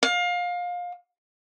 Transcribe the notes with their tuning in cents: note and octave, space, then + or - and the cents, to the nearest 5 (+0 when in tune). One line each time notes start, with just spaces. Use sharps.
F5 +25